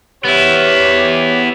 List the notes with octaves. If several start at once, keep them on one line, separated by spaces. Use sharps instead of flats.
B3 E4 G4 C#5